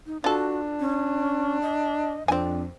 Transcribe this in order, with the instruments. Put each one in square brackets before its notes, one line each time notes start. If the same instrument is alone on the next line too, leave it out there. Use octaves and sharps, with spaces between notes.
[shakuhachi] D#4
[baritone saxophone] D4 [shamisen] F4 A4 [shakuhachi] F#4
[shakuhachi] C#4
D#5
[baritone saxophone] F2 [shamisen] C4 G#5 [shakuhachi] D4